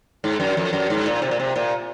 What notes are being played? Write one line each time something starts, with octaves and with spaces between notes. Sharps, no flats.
G#2
F#2
F2
F#2
G#2
A#2
C3
A#2
C3
A#2